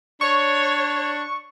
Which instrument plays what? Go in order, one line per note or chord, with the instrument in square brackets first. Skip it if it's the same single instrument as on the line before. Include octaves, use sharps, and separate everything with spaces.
[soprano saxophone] D4 [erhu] C#5 [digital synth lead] C#6